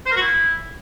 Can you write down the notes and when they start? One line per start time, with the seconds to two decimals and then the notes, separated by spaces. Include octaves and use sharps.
0.06 C5
0.11 A#4
0.16 F#4
0.21 E4